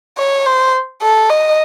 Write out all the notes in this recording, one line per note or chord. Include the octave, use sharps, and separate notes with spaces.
C#5
C5
A4
D#5